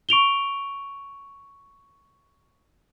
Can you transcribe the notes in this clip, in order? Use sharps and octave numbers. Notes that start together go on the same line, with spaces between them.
C#6 D7 F7 G7